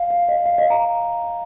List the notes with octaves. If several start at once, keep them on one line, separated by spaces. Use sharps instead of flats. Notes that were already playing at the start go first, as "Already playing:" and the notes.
Already playing: F5
F5
D#5
F5
D#5
A#5